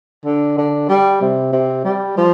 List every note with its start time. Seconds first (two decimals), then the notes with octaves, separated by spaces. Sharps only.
0.25 D3
0.58 D3
0.89 G3
1.22 C3
1.53 C3
1.85 G3
2.17 F3